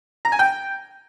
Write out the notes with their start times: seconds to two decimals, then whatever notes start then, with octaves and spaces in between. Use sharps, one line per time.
0.25 A#5
0.32 G#5
0.39 G5